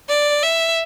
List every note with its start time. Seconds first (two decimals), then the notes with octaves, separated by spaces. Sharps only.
0.09 D5
0.42 E5